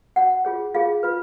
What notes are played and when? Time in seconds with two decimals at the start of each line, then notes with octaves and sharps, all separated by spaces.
0.16 F#4 C#5 F#5
0.45 F4 G#4 C#5
0.75 F4 G#4 C#5 F5
1.03 F4 B4